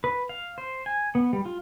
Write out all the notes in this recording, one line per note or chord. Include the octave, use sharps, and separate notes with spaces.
B4
F5
C5
G#5
B3
G3
F4